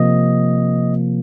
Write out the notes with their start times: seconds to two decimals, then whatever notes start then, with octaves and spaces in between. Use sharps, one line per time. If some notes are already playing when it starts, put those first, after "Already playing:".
Already playing: C3 F3 A#3 D#5